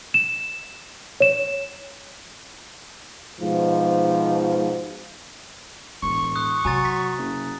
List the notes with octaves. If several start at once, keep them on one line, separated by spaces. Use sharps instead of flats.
E7
C#5 E7
G#2 B2 F3
E1 A1 C#6
D#6 F#6
C3 F#3 G#5 A#5 A6
B6
F#1